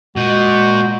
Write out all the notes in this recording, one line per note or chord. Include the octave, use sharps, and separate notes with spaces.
A#2 G#3 F#4 G6